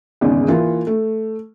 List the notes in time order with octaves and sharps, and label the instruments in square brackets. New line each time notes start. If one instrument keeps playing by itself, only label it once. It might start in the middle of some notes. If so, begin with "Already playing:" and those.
[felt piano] G#1 E2 C#3 G#3
E3 A#3 F4
A3